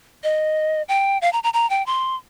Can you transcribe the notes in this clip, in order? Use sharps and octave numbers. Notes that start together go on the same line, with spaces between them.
D#5
G5
F5
A#5
A#5
A#5
G5
C6